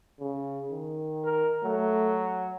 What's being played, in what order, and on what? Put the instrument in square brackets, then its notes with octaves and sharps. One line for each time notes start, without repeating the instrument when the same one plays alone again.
[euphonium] C#3
D#3
[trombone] A#4
[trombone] F#3 [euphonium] A3